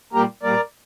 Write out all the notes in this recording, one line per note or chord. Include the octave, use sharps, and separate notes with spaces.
A#2 G3 A#3 G4 A#4
A#2 G3 A#3 A#4 D5